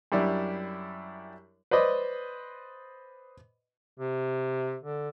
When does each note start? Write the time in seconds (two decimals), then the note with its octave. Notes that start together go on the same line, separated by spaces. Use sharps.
0.12 F#2 G3 D4 E4
1.71 B4 C5 D5 D#5 B5
4.00 C3
4.84 D3